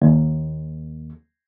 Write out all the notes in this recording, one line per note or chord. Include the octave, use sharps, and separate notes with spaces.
D#2